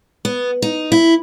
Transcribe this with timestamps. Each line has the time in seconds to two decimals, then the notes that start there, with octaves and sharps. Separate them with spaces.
0.25 B3
0.62 D#4
0.92 E4